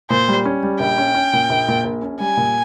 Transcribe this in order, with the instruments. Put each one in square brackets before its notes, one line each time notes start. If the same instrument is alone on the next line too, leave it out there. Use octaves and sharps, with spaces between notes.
[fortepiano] A#2 [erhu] C5
[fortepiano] G3
C#4
G3
[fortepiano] A#1 [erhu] G5
[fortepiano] C#4
C#4
A#2
A#1
A#2
A#1
C#4
[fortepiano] G3 [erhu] G#5
[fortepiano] A#2